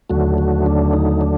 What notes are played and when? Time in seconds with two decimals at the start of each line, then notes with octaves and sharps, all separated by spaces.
0.10 D#2 D3 F#3 A3 F#4
0.38 F#4
0.66 D4
0.93 D#4
1.21 D4